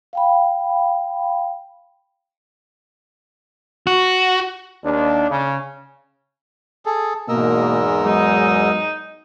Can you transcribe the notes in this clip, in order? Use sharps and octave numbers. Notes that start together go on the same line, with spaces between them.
F5 G5 B5
F#4
D#2 D4
C#3
G#4 A4
E2 G#2 B2 A#3 A#4 D#5 E6
F#3 G#3 D#4